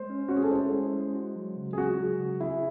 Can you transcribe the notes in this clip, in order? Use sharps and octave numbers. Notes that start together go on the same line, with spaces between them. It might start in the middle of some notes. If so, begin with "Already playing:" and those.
Already playing: G#3 C5
C#4
C#4 F#4
G#4
A4
E4 C5
G#3
G#3
F#4
F#3
C#3
G#4
F#3 F#4
F#3
C#3
E4 G#4